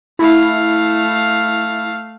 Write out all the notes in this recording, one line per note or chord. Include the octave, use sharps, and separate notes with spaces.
A3 E4 F5